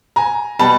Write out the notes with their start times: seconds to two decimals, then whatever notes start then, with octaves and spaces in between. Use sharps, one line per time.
0.16 G#5 A#5
0.59 B2 G3 A5 B5